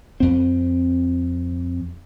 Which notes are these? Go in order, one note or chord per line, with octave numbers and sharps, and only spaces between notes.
F2 C4